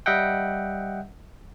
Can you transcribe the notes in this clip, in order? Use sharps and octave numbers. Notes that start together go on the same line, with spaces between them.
G3 D#5 E5 F#5 G5